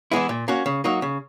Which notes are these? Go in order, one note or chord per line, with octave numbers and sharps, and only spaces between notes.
E3 G#3 B3 E4
A#2
A#3 C#4 F#4
C#3
F#3 A#3 D#4 F#4
C#3